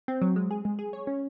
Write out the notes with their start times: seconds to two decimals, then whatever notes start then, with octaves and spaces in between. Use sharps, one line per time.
0.08 C4
0.22 F#3
0.36 G#3
0.51 G#4
0.65 G#3
0.79 G#4
0.93 C#5
1.07 C#4